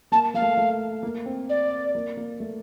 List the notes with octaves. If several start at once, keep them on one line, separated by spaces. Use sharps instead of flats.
A#3 A5
A#3 F5
A3
A3
A#3
C4
D5
A#3
A#3
A3